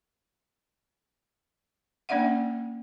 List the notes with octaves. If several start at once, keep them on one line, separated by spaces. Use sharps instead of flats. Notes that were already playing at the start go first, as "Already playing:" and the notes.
A#3 C#4 D4 D5 E5 F#5